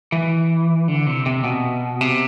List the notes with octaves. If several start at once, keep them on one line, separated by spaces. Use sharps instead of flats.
E3
D3
C3
C3
B2
C3